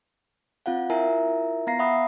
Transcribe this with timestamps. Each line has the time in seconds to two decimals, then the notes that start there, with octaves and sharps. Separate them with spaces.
0.66 C4 F4 F5 F#5
0.90 E4 F4 A#4 E5 G#5 A#5
1.67 B3 F5 A#5 A#6 C7
1.79 E5 F#5 B5 D#6